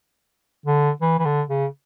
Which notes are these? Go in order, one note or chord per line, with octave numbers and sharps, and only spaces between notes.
D3
E3
E3
D3
C#3